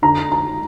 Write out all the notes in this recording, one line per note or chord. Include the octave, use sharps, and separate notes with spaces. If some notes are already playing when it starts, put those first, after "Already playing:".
D3 A#5
A#5